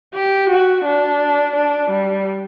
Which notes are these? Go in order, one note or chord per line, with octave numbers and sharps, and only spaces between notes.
G4
F#4
D4
D4
G3